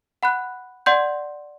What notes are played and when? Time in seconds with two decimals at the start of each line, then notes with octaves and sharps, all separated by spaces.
0.23 F#5 B5 F#6
0.86 D5 F#5 C6 G6